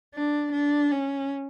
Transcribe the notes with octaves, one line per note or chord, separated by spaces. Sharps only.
D4
D4
C#4